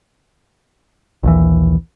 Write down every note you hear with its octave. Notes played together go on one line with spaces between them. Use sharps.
A#1 D#2 E3